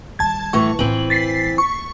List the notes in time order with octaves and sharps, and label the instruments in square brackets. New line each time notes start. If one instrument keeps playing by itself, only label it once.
[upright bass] D#3 G3 [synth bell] A5 G#6
[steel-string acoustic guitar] A2 E3 [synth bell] C#6
[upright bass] A2 F4 [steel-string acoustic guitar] E3 C4 [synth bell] F#7
[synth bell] A6 B6 C7
[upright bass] A#3
[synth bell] C#6